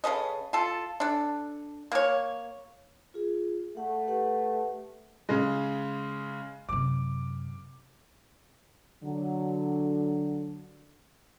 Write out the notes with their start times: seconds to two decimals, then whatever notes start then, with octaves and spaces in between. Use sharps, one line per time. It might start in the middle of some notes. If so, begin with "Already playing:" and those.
0.04 C#3 A4 B4 D#5
0.53 F4 A4
1.00 D4 A4
1.92 A#3 C#5
3.14 F4 G#4
3.77 A3 F#5
4.08 G4 B4 F#5
5.29 C#3 G#3
6.69 F#2 C3 D6
9.04 D3 F#3